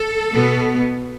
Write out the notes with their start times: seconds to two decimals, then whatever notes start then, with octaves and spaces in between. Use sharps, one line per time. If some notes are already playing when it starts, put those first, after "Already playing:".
Already playing: A4
0.33 B2 B3